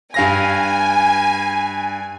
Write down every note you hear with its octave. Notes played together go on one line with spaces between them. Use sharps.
G2 F5 G#5 A#6